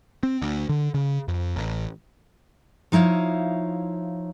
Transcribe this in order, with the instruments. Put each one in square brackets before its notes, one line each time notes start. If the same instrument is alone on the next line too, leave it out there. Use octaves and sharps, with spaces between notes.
[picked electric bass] C4
D2
D3
C#3
F2
A1
[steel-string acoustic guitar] F3 D#4 E4 C#5 F5